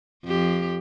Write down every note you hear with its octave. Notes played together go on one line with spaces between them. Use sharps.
F2 G4